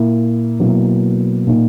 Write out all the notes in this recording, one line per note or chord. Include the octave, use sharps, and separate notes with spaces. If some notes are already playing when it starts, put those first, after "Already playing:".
Already playing: A#2 A#3 E4
B2 F#3 A#3 E4
A#2 A#3 D#4